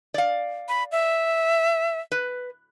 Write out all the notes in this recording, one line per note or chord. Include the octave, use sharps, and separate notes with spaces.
D5 F5
B5
E5
B4